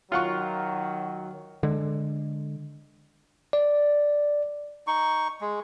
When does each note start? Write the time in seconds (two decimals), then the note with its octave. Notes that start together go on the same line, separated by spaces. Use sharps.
0.12 D#3 F#3 F4 F#5 C#6
1.63 D3 G#3
3.53 D5
4.87 D#4 C#6
5.41 G#3